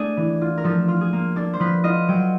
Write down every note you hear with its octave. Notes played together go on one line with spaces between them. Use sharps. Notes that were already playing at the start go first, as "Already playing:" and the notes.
Already playing: A3 D4 G#4
E3
F4
A#4
F3 A4
F4
G#4
A#3
D4 A4
C5
F3 B4
F4 D#5
F#3 G5